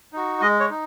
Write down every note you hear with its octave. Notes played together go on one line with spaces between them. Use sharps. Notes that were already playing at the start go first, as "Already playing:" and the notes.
D#4 F#4
G#3 D#5
C#5
D#4